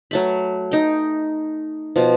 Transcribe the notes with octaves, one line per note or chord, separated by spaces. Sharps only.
F#3 A3 B5
D#4 G5
B2 F3